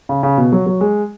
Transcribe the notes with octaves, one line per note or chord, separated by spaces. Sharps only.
C#3
C#3
B2
F#3
F#3
G#3